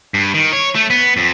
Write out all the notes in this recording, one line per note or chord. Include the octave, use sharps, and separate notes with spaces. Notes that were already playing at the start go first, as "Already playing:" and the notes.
G2
D#3
C#5
A3
B3
F2